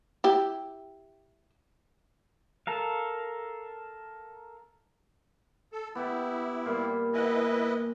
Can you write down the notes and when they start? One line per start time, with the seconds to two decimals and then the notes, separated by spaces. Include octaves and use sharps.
0.24 E4 G4
2.67 A4 A#4 F5
5.72 A4
5.95 B3 E4 G4
6.66 A#2 G3
7.14 E4 B4 D#5 F#5 G#5